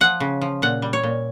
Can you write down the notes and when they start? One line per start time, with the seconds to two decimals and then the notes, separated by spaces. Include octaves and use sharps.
0.01 F3 F#5
0.20 C#3
0.42 F3
0.62 A#2 F#5
0.82 G3
0.93 C#5
1.04 A#2